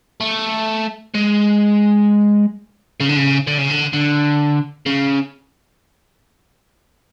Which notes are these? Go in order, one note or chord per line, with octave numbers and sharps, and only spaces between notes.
A3
G#3
C#3
D3
C#3
D3
C#3
D3
D3
C#3